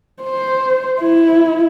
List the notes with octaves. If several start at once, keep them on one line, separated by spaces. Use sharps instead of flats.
C5
E4